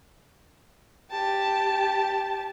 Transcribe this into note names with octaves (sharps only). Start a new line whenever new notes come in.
G4 A5